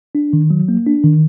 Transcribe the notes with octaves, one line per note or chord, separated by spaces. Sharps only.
D4
D#3
F#3
A#3
D4
D#3